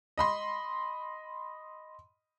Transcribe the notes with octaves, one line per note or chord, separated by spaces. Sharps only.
D#5 B5 C6